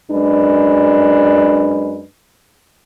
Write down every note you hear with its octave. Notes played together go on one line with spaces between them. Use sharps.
F#2 G#3 D4 B4